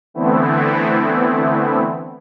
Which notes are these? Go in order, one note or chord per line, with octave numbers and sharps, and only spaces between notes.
D3 E3 A3 B3 C4 E4